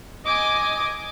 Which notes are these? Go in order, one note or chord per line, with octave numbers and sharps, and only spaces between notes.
D#5 G#5 D6